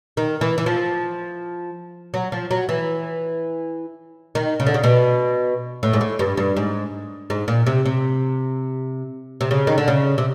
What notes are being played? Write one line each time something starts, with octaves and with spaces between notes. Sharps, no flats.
D#3
E3
E3
F3
F#3
F3
F#3
E3
D#3
C#3
D3
C#3
B2
A2
G#2
A2
G2
G2
G#2
G#2
A#2
C3
C3
C3
C#3
D#3
D3
C#3
C3